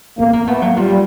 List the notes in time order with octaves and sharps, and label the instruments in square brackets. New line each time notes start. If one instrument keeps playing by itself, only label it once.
[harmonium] A#3 [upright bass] B3
[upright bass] A#3
[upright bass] A3 [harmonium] B3
[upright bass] F#3 [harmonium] A#3
[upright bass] F3 [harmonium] G3